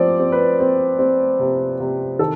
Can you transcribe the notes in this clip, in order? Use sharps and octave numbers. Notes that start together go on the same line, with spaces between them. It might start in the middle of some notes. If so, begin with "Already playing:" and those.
Already playing: F3 C4 D5
C4
B4
C4
C4
C3
C3
D#3 A4